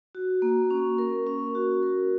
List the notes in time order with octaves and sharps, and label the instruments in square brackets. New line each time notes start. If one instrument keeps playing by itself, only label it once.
[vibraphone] F#4
A#3
C#4
A#4
C#4
F#4
A#4